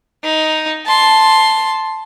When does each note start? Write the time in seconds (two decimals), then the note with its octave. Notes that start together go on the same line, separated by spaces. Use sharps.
0.24 D#4
0.86 A5 C6